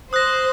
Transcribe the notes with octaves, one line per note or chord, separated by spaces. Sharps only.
C5 D#6 F#6 A#6